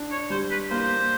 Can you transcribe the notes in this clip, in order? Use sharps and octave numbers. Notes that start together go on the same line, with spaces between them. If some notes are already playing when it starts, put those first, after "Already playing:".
Already playing: D4
C#5
G3 C5
B4
A#3 C5